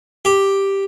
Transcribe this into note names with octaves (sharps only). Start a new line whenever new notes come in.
G4